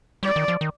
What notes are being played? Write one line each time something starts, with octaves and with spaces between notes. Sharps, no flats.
G3 D5
D#3
F3
D#3